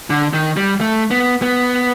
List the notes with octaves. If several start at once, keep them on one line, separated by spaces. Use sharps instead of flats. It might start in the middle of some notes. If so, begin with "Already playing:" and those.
D3
D#3
G3
A3
B3
B3